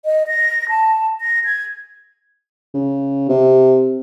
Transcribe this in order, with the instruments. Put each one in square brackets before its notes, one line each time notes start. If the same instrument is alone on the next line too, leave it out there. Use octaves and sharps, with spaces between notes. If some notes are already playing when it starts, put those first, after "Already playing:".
[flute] D#5
A#6
A5
A#6
G#6
[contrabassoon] C#3
C3